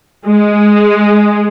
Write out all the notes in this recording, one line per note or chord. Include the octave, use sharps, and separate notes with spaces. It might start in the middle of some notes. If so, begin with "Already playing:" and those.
G#3